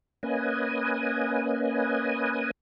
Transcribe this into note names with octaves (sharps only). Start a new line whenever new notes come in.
A#3 C#4 B4 D#5 G#5